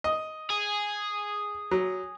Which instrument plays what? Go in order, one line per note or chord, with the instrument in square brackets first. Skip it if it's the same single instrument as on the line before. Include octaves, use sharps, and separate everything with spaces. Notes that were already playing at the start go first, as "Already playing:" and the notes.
[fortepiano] D#5
[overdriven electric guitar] G#4
[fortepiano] F#3